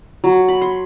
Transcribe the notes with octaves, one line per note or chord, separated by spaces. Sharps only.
F#3
B5
C6